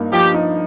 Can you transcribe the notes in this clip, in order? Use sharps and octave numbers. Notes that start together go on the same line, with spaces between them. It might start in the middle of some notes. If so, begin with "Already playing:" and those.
Already playing: G2 A#3 D#4
F3 G4
D#4